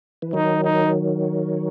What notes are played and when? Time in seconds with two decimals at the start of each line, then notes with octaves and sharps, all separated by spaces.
0.22 E3
0.33 D#3 F#3 D#4
0.64 D#4